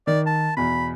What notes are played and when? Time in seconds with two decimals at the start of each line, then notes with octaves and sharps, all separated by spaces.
0.07 D#3 D5
0.26 A5
0.57 E2 B2 B5